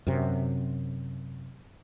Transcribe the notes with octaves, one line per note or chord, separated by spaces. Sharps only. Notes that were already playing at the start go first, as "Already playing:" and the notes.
F#2 C3